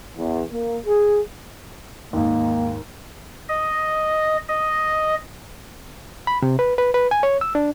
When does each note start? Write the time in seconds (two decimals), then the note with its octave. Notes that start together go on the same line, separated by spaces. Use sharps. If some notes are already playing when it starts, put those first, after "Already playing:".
0.16 E2
0.52 A#3
0.86 G#4
2.13 D#2 G#2 A#3
3.49 D#5
4.49 D#5
6.27 B5
6.42 C3
6.59 B4
6.78 B4
6.94 B4
7.11 G#5
7.23 C#5
7.41 E6
7.55 D4